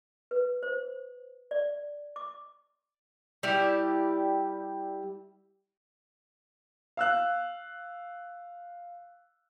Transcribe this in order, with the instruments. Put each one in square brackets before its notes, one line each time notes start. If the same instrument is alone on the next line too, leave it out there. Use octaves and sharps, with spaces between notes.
[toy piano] B4
C5
D5
D6
[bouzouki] G3 E4 G4 D5
[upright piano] F5 E6 F#6